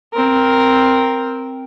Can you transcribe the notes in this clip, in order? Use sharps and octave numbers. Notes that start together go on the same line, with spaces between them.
C4 A#4